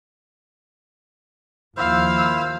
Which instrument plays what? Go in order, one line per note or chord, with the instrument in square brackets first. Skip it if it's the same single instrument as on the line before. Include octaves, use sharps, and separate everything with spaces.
[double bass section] D#2 F3 A#3 [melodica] E4 C5 [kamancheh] F5 E6